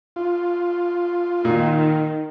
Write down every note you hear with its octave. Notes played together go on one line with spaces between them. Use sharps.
F4
A#2 D#3